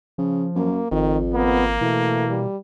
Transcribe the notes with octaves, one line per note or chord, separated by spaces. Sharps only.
C#3 F3
F#2 A#3
G#1 F2 D#3
A#3 B3
B2 E3 A3
G3